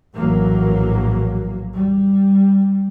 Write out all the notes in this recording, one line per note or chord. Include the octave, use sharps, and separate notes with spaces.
A#1 A2 E3 F#3 A#3
G3